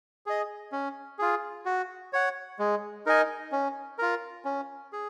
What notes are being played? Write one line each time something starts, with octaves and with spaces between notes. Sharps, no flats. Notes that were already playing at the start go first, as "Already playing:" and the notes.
G#4 D#5
C#4
F4 G#4
F#4
C#5 F#5
G#3
D#4 A#4 D#5 G#5
C#4
F4 A#4
C#4
G#4